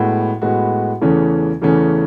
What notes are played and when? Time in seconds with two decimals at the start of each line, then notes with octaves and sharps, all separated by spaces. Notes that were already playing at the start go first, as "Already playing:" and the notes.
Already playing: A2 G#3 B3 F#4
0.42 A2 G#3 B3 F#4
1.02 E2 C#3 E3 A3 C#4
1.62 E2 C#3 E3 A3 C#4